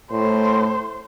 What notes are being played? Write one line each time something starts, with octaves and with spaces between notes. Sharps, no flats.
A2 C5